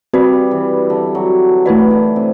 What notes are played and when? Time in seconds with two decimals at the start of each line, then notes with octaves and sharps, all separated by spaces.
0.13 G3 C4 F#4 B4 D5
0.51 E3
0.90 D3
1.15 F#3
1.66 E3 A3 E4 B4 D5
1.91 D3
2.16 C3